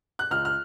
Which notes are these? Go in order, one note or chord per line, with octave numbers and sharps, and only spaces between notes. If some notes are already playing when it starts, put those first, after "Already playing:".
F#6
C#2 F6
F6